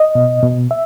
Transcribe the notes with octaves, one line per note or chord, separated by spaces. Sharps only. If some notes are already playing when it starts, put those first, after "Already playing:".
Already playing: D#5
B2
B2
E5